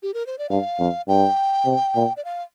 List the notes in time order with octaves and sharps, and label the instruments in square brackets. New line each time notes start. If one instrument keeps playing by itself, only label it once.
[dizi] G4
A#4
C5
D5
[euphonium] G2 [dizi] F5
[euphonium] F2
[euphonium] G2 [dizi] G5
[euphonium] C3
A#2
[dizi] D5
F5